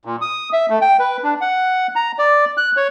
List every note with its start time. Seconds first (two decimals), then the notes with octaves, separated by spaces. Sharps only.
0.05 A#2
0.21 D#6
0.53 E5
0.69 A3
0.81 G5
0.99 B4
1.23 D4
1.41 F#5
1.96 A#5
2.19 D5
2.57 F#6
2.77 C#5